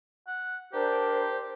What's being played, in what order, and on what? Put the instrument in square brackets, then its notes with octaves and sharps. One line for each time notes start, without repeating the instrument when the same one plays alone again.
[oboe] F#5
[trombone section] D4 A#4 [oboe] G4 [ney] C5